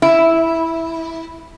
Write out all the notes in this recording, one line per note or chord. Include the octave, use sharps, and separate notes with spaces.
E4